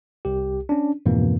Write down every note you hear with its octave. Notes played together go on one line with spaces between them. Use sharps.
C2 G4
C#4 D4
F2 G#2 B2 E3 A#3